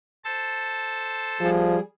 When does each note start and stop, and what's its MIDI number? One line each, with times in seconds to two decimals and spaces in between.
0.24 1.49 69
0.24 1.49 72
0.24 1.49 81
1.41 1.76 53
1.41 1.80 55
1.41 1.80 68